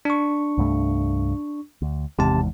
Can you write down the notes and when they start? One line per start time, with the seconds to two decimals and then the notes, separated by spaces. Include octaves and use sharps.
0.05 D4 C#6
0.58 C2 G2 A3
1.82 D2
2.19 G#1 E2 G#2 C3 A5